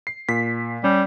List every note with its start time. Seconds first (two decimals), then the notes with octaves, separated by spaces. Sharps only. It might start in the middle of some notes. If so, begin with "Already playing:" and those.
0.07 C7
0.29 A#2 B6
0.84 G3 C#4